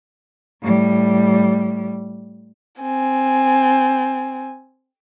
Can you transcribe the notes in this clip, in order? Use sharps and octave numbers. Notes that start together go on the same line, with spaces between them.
A2 G3
C4 G#5